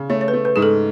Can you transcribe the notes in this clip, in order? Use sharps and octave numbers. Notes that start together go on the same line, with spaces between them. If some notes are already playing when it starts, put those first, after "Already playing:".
Already playing: C#3
A3 C#5
C#5
B4
A3
B4
G#2 G#4
A4